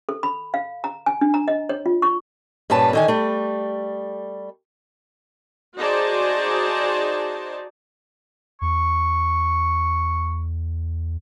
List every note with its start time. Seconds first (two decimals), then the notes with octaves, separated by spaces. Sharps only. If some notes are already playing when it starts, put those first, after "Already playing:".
0.09 A4
0.23 B5
0.54 F5
0.84 A#5
1.06 G#5
1.21 D4
1.34 A#5
1.48 D#5
1.69 C#5
1.86 F4
2.02 C#6
2.70 G2 A#2 C#4 B4 A5
2.93 D3 D#3 G#5
3.08 G3 A3
5.77 D#4 F#4 G#4 C5 D5 A5
8.62 E2 C#6